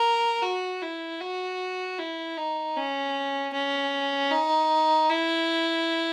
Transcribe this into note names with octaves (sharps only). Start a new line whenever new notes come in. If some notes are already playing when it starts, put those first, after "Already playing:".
Already playing: A#4
F#4
E4
F#4
E4
D#4
C#4
C#4
D#4
E4